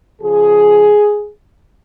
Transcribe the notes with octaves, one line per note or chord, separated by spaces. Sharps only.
C#3 F3 G#4